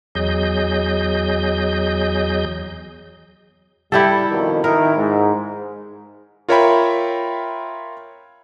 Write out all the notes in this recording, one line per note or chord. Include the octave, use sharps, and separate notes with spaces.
E2 F#3 G#4 D#5 G6
G3 E4 G4 A4
F2 B2 D#3
D#3 D#4 E4 A#4
G#2
F4 A#4 C#5 E5 G5 B5